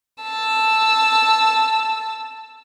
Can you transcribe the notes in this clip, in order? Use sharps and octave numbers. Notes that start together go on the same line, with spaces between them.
A5 E6